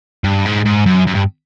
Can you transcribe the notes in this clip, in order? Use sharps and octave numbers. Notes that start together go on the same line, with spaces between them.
G2
G#2
G#2
F#2
F#2
G2